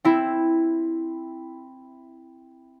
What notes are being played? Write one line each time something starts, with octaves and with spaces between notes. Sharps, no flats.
C4 E4